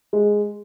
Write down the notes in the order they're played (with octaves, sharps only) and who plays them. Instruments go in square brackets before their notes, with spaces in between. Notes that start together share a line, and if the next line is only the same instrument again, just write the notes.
[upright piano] G#3